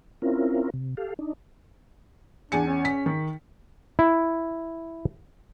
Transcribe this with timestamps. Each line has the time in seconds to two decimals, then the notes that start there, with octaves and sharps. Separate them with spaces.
0.22 C4 C#4 E4 F4 A#4
0.74 C3
0.97 G4 A4 F5
1.19 D4 D#4
2.52 E2 D4 G#5 C#7
2.67 C#4
2.85 B6
3.06 D#3
3.99 E4